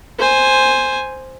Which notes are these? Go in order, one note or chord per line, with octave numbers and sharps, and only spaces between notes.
C5 G#5